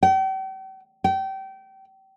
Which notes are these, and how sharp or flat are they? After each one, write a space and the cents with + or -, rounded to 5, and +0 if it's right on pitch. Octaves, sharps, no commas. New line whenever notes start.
G5 -40
G5 -25